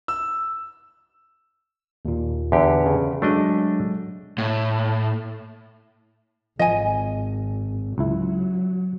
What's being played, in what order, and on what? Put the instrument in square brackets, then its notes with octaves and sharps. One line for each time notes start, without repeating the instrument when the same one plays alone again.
[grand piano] E6
[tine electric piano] D#2 A#2
[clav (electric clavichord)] E2 D3 G4
[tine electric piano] C#3
[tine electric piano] F#3 G#3 [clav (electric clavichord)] A3 D4 D#5
[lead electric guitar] A2
[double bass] G#1 [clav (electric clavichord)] F3 [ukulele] D#5 G#5
[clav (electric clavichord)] C#2 E4 [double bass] F#3